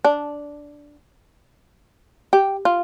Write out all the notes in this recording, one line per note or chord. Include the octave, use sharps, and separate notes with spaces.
D4
G4
F4